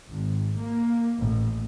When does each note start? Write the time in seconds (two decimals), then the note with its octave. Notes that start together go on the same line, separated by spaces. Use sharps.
0.10 G#1
0.58 A#3
1.20 A1